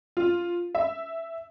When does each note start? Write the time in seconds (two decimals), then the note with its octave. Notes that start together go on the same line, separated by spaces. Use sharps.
0.17 F4
0.75 E5